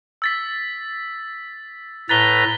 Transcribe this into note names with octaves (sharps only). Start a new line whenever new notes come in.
E6 A6 B6
A2 B4 A#5 A6 B6 G7